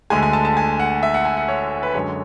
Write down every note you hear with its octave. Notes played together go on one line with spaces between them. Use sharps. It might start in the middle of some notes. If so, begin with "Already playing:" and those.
D2 D3 G#3 G#5
G#5
A5
A5
G#5
F#5
E5
F#5
G#5
F#5
C#5
B4
F#2 D3 G#3 C#5